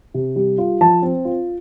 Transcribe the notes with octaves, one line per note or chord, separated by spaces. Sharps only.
C3
G3
F4
F3 A5
C4
F4